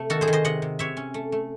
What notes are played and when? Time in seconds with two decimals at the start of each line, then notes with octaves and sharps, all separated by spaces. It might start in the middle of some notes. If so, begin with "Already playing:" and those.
Already playing: C3 A3
0.10 D#3 F#4 A4
0.21 G#4 C5
0.28 D#3
0.33 C5 D#5
0.44 C3 D#5 F#5
0.62 C3
0.79 C3 C#5 E5
0.97 C#4
1.14 A3
1.32 A3